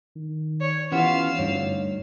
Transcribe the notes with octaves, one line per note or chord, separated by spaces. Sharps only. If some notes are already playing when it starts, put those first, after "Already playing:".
D#3
C#5
E3 B3 C#4 F4 G4 F5 F#5 E6
D2 G2 D#4 C#5